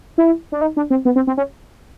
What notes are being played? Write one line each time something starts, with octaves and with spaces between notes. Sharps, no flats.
E4
D4
D#4
D4
C4
B3
C4
C4
C#4